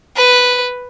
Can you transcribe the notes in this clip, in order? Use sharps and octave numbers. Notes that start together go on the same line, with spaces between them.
B4